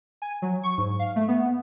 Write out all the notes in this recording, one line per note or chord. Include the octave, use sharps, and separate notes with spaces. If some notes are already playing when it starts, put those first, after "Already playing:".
G#5
F#3
C#6
G#2
F5
A3
B3